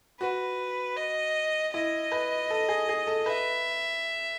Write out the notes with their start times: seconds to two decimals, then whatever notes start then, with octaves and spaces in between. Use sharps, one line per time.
0.20 F#4 B4
0.97 D#5
1.73 E4 D#5
2.12 B4
2.50 A4
2.69 G#4
2.89 G#4
3.07 A4
3.26 B4 E5